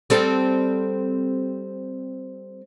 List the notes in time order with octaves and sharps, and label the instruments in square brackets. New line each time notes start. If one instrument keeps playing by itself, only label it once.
[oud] G3 C4 A4